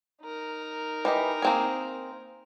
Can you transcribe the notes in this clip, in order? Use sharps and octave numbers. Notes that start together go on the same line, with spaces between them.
D#4 A#4
E3 G4 D#5
A#3 C4 G#4